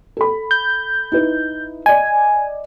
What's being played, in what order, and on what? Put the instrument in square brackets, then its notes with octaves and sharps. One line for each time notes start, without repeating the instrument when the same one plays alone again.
[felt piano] A4 B5
[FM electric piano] G6
[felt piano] D#4 E4 B4
[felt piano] D5 D#5 [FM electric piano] G#5